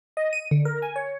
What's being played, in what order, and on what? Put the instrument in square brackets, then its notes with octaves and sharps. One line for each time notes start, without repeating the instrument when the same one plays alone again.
[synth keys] D#5
D#7
D3
A#4
G#5
C#5